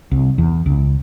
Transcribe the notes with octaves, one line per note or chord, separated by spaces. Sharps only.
C2
E2
C#2